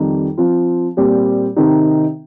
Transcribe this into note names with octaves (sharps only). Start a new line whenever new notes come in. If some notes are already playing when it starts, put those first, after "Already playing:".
Already playing: F2 D#3 G3 D#4 G4
F3 C4 F4
A#2 G3 C4 G4
C3 D#3 C4 D#4 G4